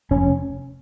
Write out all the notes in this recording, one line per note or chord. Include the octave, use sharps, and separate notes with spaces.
F1 C#4